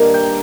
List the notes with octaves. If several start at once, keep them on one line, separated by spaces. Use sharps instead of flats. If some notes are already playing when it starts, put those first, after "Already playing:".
Already playing: G2 D#3 A#3
G5